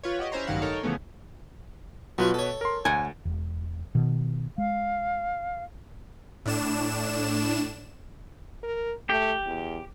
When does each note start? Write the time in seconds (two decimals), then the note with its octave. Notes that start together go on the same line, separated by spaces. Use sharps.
0.03 F4 B4 C#5
0.19 F#4 G4 D#5
0.32 C#4 E4 C5 C#5 A#5 C6
0.47 A1 G2 D#3 F#3 F5 F#5
0.62 D#4 A4 A#4 C#5
0.83 C#3 E3 F3 A3 B3 C#4
2.18 B2 F#3 F4 F#4 B4
2.34 A4 C#5
2.61 A#4 C6
2.85 D2 F#5 G#5
3.25 E1
3.95 B2 D#3
4.58 G#3 F5
6.45 A2 D4 E7
8.63 A#4
9.09 A3 G4
9.46 E2